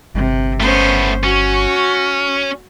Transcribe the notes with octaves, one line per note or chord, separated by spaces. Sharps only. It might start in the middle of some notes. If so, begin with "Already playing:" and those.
G1 C3
A3 B3 C#4 C5
C#4 F#4